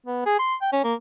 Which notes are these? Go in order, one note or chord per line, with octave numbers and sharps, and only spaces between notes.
B3
G#4
C6
G5
C#4
A#3